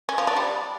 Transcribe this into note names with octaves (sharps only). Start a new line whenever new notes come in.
C#4
F3
D4
G3